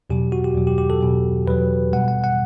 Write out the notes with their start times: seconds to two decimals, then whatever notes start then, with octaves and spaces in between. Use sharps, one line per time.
0.10 E2 B2 F#3 G4
0.32 F#4
0.44 G4
0.55 E2 B2 F#3
0.67 G4
0.78 G4
0.90 A4
1.01 E2 B2 F#3
1.47 E2 B2 F#3 B4
1.93 B2 G3 F#5
2.08 F#5
2.24 F#5